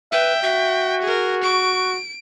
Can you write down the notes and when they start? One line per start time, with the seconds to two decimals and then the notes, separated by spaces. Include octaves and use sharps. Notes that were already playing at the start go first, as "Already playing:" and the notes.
0.12 B4 E5 G5
0.43 F#4 E5
1.03 G#4 A#4
1.43 C#6 D7